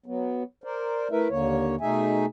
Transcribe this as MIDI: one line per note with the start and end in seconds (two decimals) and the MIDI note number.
0.06 0.43 54
0.06 0.43 59
0.64 1.08 70
0.64 1.08 72
0.64 1.08 74
1.11 1.28 57
1.11 1.28 64
1.11 1.28 70
1.11 1.28 71
1.11 1.28 76
1.30 1.76 39
1.30 1.76 50
1.30 1.76 58
1.30 1.76 73
1.81 2.26 47
1.81 2.26 57
1.81 2.26 63
1.81 2.26 68
1.81 2.26 76
1.81 2.26 80